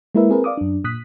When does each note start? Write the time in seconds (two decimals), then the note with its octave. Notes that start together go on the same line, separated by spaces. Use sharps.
0.15 G#3 A#3 E4 A#4 B4 E5
0.30 C4 G#4 A#4 B4
0.44 D5 F5 D6 D#6
0.57 F#2 D4
0.84 A#2 D#6 F#6 B6